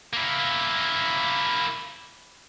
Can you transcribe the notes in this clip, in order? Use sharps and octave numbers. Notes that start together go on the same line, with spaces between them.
A#3 E4